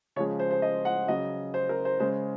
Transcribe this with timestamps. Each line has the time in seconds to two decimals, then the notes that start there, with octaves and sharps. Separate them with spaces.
0.16 C#3 F3 G#3 C#5
0.39 C5
0.51 C5
0.62 D#5
0.85 F#5
1.08 C#3 F#3 D#5
1.54 C5
1.69 A#4
1.85 C5
2.00 C#3 G#3 C5